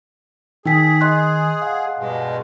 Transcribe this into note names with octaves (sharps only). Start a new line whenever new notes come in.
D#3 D#4 G#4 G5 B6
D#5 C6 F#6
F5 F#5
G2 B2 G#3